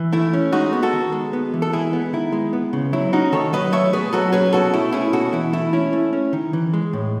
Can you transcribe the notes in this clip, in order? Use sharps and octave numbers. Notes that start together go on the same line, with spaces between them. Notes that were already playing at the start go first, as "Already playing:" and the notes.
Already playing: E3
A3 E4
C#4
G#3 D#4 F#4
B3
F#4 A4
D#3
G#3
B3
E3
A4
G#3 E4 G#4
B3
D#3 E4
G#3
B3
C#3
F#3 E4
C#4 D#4 F#4
D#3 A4 C#5
F#3 B4 D#5
A3 C#5 E5
B2 G#4 B4
F#3 F#4 A4
C#4 G#4 B4
B2 F#4 A4
A3 E4
C#4 E4 G#4
B2 F#4 A4
E3 E4
A3 E4
C#4 E4
A3
C#4
D#3
E3
G#3
A2